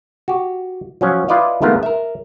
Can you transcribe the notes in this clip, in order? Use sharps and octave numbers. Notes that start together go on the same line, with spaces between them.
F#4 G4
F3 F#3 C#4
E4 F4 B4 D5 D#5 F5
D#3 G#3 A3 B3 F4 A#4
A#4 E5